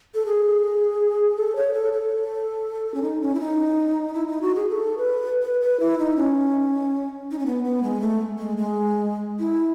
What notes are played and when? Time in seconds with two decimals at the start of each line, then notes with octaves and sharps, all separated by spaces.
0.15 A4
0.26 G#4
1.37 A4
1.56 C#5
1.74 A4
1.93 A4
2.94 C#4
3.03 D#4
3.21 C#4
3.35 E4
3.40 D#4
4.14 E4
4.27 D#4
4.42 F#4
4.55 G#4
4.69 A4
4.98 B4
5.43 B4
5.61 B4
5.80 E4
5.99 D#4
6.17 C#4
7.31 D#4
7.39 C#4
7.46 B3
7.64 B3
7.83 G#3
8.01 A3
8.39 G#3
8.57 G#3
9.39 E4